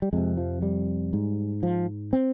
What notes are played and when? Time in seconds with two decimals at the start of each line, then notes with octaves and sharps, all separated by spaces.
0.02 G3
0.13 F2 C3 G#3
0.37 F3
0.62 G3
1.13 G#2
1.63 F3
2.13 C4